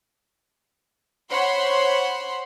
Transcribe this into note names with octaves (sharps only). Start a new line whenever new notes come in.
C5 C#5 F#5 B5 C6